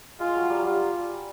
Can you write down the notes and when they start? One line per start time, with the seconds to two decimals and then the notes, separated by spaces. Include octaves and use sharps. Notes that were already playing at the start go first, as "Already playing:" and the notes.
0.19 G#3 F4
0.35 F#3
0.50 G3
0.57 F#3
0.65 G3 F4